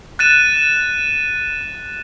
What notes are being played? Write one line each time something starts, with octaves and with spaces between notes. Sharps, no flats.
F#6 A6 D#7 E7